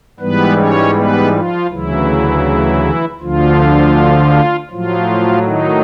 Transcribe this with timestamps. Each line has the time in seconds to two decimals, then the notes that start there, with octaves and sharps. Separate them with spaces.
0.20 G#2 E3 G3 B3 B4
0.57 C#4 C#5
0.95 B3 B4
1.33 F3 F4
1.70 D2 C#3 E3 F#3 E4
3.20 D2 D3 F3 F4
4.70 A2 F3 F#3 F4
5.45 D#3 D#4